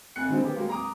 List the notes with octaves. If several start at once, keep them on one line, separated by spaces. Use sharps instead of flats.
F1 G#5 F#6 C#7
D3 D#3 F#3 G#3 C4 D#4
B3 G4
F#3 G#3 A#3
A#5 D6 D#6